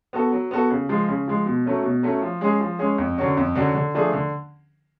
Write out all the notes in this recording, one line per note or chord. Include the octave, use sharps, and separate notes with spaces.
B3 F#4 A4
F#3
B3 F#4 A4
C#3
F3 G#3
C#3
F3 G#3
B2
F#3 A3 C#4
B2
F#3 A3 C#4
F3
G#3 C#4 G#4
F3
G#3 C#4 G#4
F2
D3 F#3 C#4 F#4
F2
D3 F#3 C#4 F#4
D3
F3 A3 D4 G#4
D3